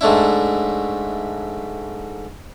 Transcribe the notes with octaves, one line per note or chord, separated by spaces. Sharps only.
G#2 A3 D4 E4